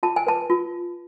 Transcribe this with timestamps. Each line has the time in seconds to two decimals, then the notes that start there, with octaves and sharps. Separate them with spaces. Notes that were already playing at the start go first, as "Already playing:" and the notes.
0.03 F4 A5
0.16 G#5
0.27 B4 A5
0.50 F4